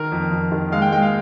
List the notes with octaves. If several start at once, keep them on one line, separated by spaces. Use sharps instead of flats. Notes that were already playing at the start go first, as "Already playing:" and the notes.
Already playing: D#3 A#4
F2
F2
D#3
G#3 F5
G5
G#3 G5
F5